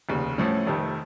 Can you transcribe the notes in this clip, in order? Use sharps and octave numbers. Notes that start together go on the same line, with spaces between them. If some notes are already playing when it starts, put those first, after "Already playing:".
F1 D#2 C#3
A1 A2 F3 A3 C#4
F1 F2 C3 D#3 A3